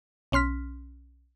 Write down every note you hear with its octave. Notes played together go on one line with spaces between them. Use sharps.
B1 C#4 C6 F6 B6